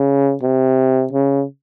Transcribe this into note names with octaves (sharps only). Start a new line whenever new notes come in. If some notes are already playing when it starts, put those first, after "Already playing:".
Already playing: C#3
C3
C#3